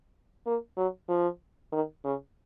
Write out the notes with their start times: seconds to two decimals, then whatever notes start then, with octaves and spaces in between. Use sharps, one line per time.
0.46 A#3
0.77 F#3
1.09 F3
1.72 D#3
2.04 C#3